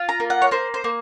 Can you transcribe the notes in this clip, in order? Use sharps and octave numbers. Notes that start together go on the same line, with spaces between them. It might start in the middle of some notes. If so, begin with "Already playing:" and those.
Already playing: F4
A#5
A#3
F#5
C#5
A#3 C5
C5
A#3